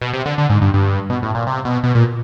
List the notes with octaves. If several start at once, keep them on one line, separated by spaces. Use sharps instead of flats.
B2
C3
D3
D3
G#2
G2
G2
B2
A2
A#2
C3
B2
B2
A#2